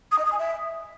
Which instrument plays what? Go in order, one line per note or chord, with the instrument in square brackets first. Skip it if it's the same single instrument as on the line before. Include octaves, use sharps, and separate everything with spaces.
[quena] D#6
D#5
D#6
G#5
E5